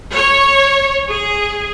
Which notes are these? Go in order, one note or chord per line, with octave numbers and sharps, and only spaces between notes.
C#5
G#4